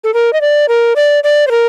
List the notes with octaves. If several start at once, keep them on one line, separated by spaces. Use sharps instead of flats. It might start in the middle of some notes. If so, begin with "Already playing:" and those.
A4
A#4
D#5
D5
A#4
D5
D5
C5
A#4